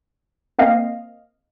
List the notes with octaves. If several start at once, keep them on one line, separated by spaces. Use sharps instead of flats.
A#3 C4 D#5 F5